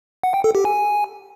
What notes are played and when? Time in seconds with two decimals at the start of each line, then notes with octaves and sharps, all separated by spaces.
0.23 F#5
0.34 G5
0.44 A4
0.55 G4
0.65 G#5